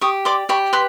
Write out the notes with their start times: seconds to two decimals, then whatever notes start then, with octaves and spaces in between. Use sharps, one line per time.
0.01 G4 C#6 D#6
0.25 D5 C6 D6
0.49 G4 B5 C#6
0.73 B4 C6